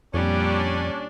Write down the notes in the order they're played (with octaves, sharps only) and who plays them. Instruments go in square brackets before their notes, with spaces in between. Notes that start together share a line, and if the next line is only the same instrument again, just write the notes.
[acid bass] F2 [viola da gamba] A#2 G3 [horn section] C#4 D4